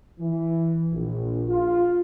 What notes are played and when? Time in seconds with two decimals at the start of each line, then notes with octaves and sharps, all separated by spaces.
0.19 E3
0.92 A#1
1.48 F4